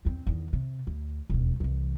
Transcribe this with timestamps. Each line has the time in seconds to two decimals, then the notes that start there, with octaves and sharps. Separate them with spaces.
0.05 E2 C4
0.27 E2 D#3
0.53 C3
0.87 D2
1.30 E1 D#2
1.60 C2 E3